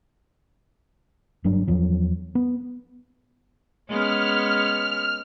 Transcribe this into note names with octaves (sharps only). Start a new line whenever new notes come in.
F#1 G2 F#3 D4
E2 F3 F#3
B3
G#3 B3 C#4 F6